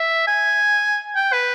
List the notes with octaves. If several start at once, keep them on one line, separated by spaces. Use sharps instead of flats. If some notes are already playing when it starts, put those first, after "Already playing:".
Already playing: E5
G#5
G5
B4